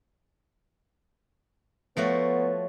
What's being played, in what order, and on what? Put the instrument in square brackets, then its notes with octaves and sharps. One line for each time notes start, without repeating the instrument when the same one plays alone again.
[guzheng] F3 A3 F#4 [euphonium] B3 [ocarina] C#5